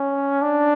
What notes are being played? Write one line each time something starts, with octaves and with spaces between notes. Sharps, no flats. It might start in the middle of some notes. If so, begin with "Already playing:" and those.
Already playing: C#4
D4